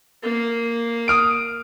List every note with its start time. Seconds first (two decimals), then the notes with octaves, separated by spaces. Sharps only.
0.23 A#3
1.08 D#6 F6 D7